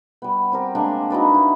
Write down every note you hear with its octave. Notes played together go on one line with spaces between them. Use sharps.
G3 B3
C4 G4 A#4
G#3 A#3 D4
D#4 F#4 B4 D5
E4